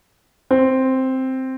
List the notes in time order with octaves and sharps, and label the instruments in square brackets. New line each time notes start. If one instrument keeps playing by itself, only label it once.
[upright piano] C4